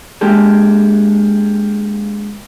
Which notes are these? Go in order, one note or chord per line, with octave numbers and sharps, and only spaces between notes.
G#3 A#3 D4 G4 A4